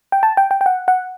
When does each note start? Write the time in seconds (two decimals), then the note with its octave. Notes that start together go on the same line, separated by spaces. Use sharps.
0.12 G5
0.23 A5
0.37 G5
0.51 G5
0.61 G5
0.66 F#5
0.88 F#5